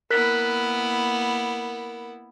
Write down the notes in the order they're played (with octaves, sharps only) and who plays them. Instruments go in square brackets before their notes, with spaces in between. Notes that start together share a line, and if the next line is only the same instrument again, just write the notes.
[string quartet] A#3 B3 E4 [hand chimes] A#4 F#6 B6